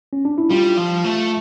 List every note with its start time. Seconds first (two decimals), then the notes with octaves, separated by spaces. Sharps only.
0.13 C#4
0.25 D4
0.38 E4
0.50 G3 F4
0.77 F3
1.04 A3